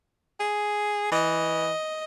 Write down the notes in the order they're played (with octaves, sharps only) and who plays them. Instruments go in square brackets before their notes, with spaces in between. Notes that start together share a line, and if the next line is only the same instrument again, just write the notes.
[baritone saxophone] G#4
[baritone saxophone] E3 [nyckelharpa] D#5